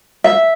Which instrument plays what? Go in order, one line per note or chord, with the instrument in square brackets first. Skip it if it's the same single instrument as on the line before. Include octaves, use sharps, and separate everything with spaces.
[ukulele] E5